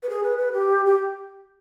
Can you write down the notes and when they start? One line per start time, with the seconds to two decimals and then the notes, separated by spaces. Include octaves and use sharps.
0.03 B4
0.09 G#4
0.23 B4
0.38 B4
0.53 G4
0.86 G4